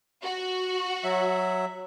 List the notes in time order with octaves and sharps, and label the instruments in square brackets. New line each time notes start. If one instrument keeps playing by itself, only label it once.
[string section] F#4
[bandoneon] F#3 E5